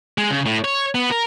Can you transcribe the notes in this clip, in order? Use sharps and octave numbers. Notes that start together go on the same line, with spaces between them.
G#3
C#3
A2
C#5
B3
A#4